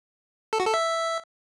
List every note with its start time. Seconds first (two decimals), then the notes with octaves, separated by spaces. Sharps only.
0.53 A4
0.60 F#4
0.67 A4
0.74 E5